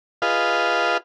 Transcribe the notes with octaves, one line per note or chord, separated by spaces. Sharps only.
F4 G#4 B4 D#5 F5